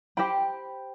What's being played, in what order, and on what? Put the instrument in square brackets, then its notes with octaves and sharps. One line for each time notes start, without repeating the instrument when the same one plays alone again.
[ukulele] G4 C5 G5 B5